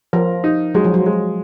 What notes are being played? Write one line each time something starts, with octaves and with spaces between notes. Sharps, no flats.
F3 A#4
D#4
F#3 G#3
F3
F#3
G#3